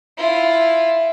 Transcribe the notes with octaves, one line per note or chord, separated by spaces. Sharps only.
E4 F4